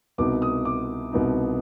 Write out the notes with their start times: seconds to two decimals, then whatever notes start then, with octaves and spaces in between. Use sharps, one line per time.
0.18 C2 B2 B3 D#4 D6
0.42 D#6
0.65 D6
1.12 C2 B2 B3 D#4